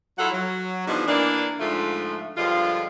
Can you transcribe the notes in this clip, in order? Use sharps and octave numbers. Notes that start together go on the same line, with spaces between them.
F#3 E4 F4 A4 F#5
F#3
B2 E3 F3 G#3 D4 D#4
E3 A#3 B3 D4
G#2 D3 F3 A3 F4
G2 D3 F3 G#3 F4